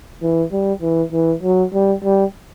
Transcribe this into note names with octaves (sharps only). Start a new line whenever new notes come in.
E3
G3
E3
E3
F#3
G3
G3